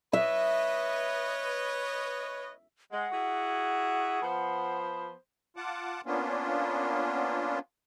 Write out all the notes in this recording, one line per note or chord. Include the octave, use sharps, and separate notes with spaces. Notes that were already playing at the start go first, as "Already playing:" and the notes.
B4 C#5 D#5 E5
G#3 F#5
E4 F#4 G#4
F3 B3 C5
F4 F#5 A5 D6
A#3 B3 C#4 D4 F4